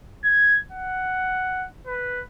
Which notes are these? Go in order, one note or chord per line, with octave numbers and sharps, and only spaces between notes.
G#6
F#5
B4